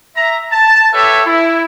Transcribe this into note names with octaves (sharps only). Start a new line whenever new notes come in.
E5 A#5
A5
G4 A4 B4 C#5 E5
E4